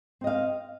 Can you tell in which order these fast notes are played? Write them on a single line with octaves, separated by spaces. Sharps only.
C4 D#5 F5